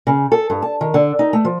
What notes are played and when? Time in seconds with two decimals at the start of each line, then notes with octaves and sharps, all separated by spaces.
0.07 C#3
0.32 A4
0.50 G2
0.62 A5
0.81 D#3
0.94 D3
1.19 D#4
1.33 A3
1.45 F3